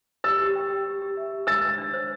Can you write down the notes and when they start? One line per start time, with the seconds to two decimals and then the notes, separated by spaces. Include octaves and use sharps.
0.24 G4 E6 A6
0.40 G4
0.56 G5
0.70 G4
0.86 G4
1.02 G4
1.17 E5
1.32 G4
1.47 D4 E6 A6
1.62 D4
1.78 D4
1.93 C5